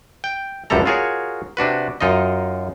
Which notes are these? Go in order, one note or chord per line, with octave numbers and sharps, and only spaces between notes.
G5
C#2 F#2 C3 G3 A4 A#5
F4 F#4 G#4 A#4 C#5
C3 D4 F#4 B4
F#2 D#4 F4 D#5